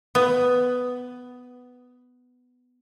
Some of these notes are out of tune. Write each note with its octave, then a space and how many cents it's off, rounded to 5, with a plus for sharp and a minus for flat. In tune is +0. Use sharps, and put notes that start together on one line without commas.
B3 +10